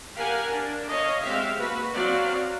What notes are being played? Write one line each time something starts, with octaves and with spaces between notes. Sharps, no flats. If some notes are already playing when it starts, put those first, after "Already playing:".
G4 A#4 F5 F#5 G#5
D4
C#5 D#5 F5
G#3 C4 G4 E5 F5
A#3 F#4 B4
F#3 C4 F#4 D5 F5